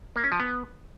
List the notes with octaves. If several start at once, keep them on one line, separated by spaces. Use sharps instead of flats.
A#3
C#4
F3
B3